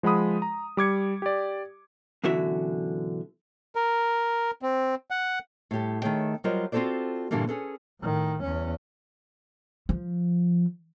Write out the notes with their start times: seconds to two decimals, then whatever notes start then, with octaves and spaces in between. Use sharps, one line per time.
0.03 F3 G#3 F#5 B5 D#6
0.42 A#5
0.77 G3 D6 G#6 C#7
1.22 G4 D5
2.24 F#2 B2 D3 E3 F#4 E5
3.75 A#4
4.62 C4
5.11 F#5
5.71 A2 G3 G4 A4
6.02 D#3 A3 G#4 C#5 G5
6.44 F#3 G3 F4 A#4 C5 D#5
6.72 C4 F4 F#4 A4 C5 D5
7.31 G2 A#2 D3 E3 G3 A#3
7.47 C#4 G#4 A4 B4
8.01 A2 D#3
8.42 E2 C#4
9.89 F3